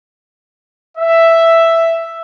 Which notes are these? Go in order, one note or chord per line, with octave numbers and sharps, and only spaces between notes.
E5